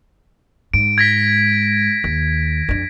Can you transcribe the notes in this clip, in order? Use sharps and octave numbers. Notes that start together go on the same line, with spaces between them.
G#2 D7
G#6 A#6 B6
D#2
F2 D4